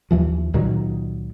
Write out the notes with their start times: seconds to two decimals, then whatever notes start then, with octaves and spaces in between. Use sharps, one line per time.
0.11 D#2 E3 F3
0.54 C#2 A#2 D#3 F#3